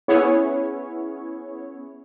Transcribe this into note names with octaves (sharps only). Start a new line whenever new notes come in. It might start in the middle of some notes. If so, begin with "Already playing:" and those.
B3 C#4 E4 G#4 C#5